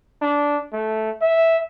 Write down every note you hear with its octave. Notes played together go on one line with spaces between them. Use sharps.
D4
A3
E5